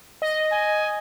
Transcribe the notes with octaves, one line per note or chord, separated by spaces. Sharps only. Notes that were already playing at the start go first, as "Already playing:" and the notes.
D#5
G#5